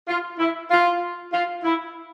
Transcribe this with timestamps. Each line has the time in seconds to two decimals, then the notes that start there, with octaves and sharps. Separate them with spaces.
0.08 F4
0.39 E4
0.71 F4
1.33 F4
1.64 E4